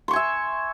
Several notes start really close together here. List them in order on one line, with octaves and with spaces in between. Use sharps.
C6 C#6 G#5 E5